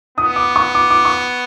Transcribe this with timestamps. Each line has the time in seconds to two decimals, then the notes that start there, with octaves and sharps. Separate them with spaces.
0.18 B3 D#6
0.36 D6
0.56 C#6
0.75 D6
0.90 D6
1.05 C#6